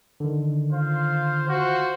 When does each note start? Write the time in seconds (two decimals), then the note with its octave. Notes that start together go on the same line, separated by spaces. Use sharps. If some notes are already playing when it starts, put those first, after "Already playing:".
0.20 D3 D#3
0.71 F4 C5 F5
1.49 F4 F#4 C5